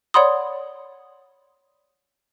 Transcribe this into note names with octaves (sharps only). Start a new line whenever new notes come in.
C#5 D5 F#5 B5 C6 D#6